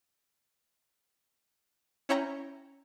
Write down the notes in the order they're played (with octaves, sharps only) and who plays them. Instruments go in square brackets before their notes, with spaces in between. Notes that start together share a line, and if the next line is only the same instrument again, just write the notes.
[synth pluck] C#4 E4 C#5 G5 A#5